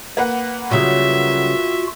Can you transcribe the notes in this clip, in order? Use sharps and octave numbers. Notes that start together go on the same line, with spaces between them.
A#3 B4 F#5
C#3 F#3 G3 F4 F#4 E5